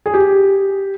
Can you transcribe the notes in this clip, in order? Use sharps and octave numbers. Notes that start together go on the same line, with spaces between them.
G#4
G4